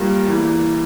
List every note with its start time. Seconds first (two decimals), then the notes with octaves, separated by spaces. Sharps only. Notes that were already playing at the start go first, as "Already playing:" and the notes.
Already playing: G2 G3 A#3 F4 A#4
0.27 E2 E3 A#3 E4